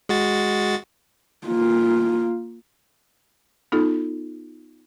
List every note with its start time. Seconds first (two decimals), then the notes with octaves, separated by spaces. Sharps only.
0.09 G#3 F#4 A6
1.47 A#3 F4
3.72 B3 D#4 F4 A4